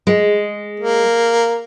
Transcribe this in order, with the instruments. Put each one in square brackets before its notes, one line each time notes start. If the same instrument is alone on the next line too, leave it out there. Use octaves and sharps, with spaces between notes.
[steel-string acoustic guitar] G#3
[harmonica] A#3